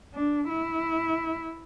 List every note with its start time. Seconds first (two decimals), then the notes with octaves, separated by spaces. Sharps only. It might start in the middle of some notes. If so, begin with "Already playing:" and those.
0.15 D4
0.49 E4